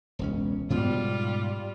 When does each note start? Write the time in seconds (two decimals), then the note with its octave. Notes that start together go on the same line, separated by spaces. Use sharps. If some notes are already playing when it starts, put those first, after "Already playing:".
0.19 E1 C#2 C#4
0.70 G#2 B2 G3 B3 F4